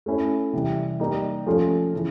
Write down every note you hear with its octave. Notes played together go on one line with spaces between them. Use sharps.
A3 C#4 E4
C3 E3 G3
G3 A#3 D#4
F3 A3 C#4 F4 A4
C#3 E3